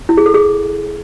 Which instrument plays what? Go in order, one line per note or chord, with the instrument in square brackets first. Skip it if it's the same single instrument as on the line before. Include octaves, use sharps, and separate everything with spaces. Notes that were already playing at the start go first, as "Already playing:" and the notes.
[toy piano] E4
G#4
A4
G#4